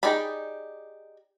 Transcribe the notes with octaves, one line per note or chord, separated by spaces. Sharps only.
D#4 G4 G#4 D5 B5